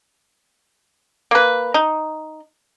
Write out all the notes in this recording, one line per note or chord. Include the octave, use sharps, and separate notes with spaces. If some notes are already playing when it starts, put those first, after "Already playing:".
A#3 B4
D#4